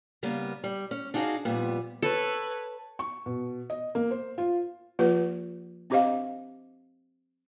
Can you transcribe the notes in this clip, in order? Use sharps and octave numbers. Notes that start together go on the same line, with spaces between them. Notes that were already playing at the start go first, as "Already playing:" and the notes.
C#3 G3 A#3 B3
G3
C#4
D4 D#4 F#4 G#4 D5 F5
F2 A#2 G3 B3
A4 B4 C#5
C#6
B2
D#5
A#3
C5
F4
F3 A#3 F4 G4 B4
C4 D4 G4 C5 D#5 F5